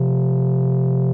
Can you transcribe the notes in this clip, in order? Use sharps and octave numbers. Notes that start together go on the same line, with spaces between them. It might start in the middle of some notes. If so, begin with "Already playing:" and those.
Already playing: C3 F3